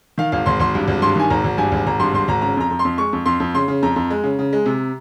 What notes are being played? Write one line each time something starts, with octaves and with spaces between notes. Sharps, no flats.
D#3 F5
G#1 F5
G#1 C6
G#1 C6
G2
G#1
G2 C6
D#3 G#5
G#1 A#5
G#1
G2 G#5
G#1
G#1 A#5
G2 C6
G#1 C6
G#1 A#5
C#3 A#5
F2 A#5
F2
C6
F2
G#3 C#6
F2
F2 C6
F2
C#3 C6
C#3
F2 A#5
F2
G#3
C#3
C#3
G#3
C3